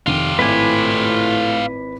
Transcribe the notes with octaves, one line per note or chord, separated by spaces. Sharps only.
F1 D#3 F4 G4 D#7
G#1 A2 E4 B4 G#5 D6